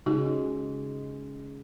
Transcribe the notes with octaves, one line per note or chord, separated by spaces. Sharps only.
C#3 G#3 D#4 F#4 G4